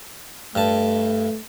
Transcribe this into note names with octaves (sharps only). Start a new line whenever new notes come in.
G2 A3 A5